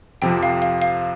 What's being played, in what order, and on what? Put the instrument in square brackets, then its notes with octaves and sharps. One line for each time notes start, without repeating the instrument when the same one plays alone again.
[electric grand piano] F2 C3 F3 [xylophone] G5
[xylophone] F5
F5
F5